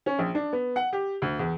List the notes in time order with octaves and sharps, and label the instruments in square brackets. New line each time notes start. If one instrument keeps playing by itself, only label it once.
[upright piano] C#4
A#1
D4
B3
F#5
G4
D2
E2